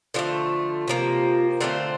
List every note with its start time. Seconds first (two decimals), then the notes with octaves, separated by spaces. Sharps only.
0.14 D3 F3 A3 F4
0.88 C3 F3 A#3
1.61 D3 A3 C4 F4